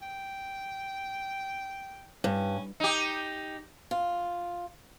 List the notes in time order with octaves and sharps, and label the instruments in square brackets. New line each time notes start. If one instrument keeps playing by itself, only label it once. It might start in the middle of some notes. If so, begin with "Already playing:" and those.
[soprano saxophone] G5
[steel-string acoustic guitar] G2 [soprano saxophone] C#4
[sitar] D#4 G4
[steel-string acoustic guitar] F4